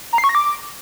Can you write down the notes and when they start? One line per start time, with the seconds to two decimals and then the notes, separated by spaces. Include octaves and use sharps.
0.13 A#5
0.18 C7
0.24 C#6
0.29 A#6
0.35 D6